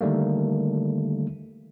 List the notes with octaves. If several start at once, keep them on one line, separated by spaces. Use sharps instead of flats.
D3 D#3 G3 A3 A#3